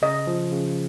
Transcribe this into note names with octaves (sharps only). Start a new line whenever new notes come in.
C#3 D#5
F3
C#3